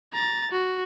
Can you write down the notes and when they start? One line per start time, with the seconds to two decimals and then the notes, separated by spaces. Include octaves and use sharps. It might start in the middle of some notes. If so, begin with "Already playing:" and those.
0.13 A#5 A6
0.51 F#4